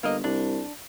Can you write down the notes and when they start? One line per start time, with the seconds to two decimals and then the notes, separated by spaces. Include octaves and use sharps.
0.03 G1 A#3 A#4 D#5
0.24 C2 D4